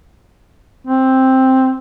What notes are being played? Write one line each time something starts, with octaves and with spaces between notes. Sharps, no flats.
C4